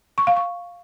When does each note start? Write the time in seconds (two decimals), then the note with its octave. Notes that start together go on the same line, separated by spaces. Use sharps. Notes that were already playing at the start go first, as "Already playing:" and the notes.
0.18 C#6
0.27 F5
0.36 C#6